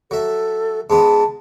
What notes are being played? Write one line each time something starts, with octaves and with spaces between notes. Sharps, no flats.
F#3 A4 E5
G#2 G#3 B3 A5